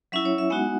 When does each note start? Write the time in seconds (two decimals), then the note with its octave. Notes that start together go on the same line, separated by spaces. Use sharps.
0.12 F#3 C#4 E4 E5
0.25 C#5
0.38 E5
0.50 G#3 B3 D#4 F#4 F#5